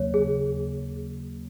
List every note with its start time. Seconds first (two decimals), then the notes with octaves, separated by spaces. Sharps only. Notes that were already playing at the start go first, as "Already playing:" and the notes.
Already playing: D#2 C#3 F#3 A#3 C#5
0.14 G#4